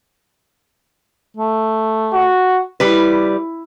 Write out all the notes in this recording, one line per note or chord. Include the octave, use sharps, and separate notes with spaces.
A3
F#4
G3 E4 B4